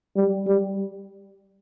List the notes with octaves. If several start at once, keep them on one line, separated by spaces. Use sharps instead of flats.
G3
G3